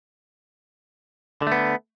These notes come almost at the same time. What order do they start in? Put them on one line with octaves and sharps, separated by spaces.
D3 A3 B3